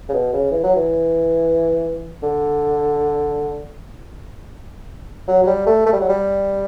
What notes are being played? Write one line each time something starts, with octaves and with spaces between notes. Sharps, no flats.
C#3
B2
C#3
E3
F#3
E3
D3
F#3
F#3
G3
A3
A3
G3
F#3
G3